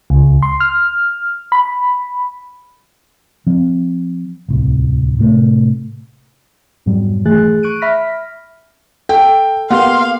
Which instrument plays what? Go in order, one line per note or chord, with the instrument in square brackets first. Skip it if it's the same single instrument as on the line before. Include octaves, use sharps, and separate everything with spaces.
[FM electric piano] C#2
C6
F6
B5
[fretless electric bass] F3 C4
D1 C2
A2 C3 A3
[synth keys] F2 G#2 B2 F#3 G3
D#3 E3 A3 G#4 F#6 A6
C#6 F#6 D7 D#7
E5 B5 F6 A#6 B6
[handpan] A4 [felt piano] G5
[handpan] A#3 B3 G4 [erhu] F5 [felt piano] F#5 [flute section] C6